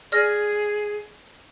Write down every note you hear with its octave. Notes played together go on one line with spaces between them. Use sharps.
G#4 D5 F6 A#6